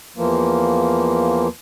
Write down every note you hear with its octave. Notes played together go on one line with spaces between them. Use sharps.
E2 E3 F3 A#3